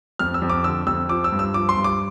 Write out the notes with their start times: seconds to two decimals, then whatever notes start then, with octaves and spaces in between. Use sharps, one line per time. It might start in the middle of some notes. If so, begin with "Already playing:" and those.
0.19 F2 F6
0.34 E6
0.42 F2
0.49 D6
0.64 D3 E6
0.87 F2 E6
1.09 F3 D6
1.24 E6
1.32 G2
1.39 E6
1.54 F3 D6
1.69 C6
1.77 G2
1.84 D6